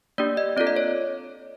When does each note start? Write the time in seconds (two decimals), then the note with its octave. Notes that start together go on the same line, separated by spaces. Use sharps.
0.18 A#3 D4 G4 D5
0.37 D#5
0.57 C4 F4 A4 D5
0.67 D#5
0.76 C#5